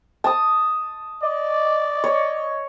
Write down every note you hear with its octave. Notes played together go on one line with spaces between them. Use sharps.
A5 D#6
D5 D#5
C#5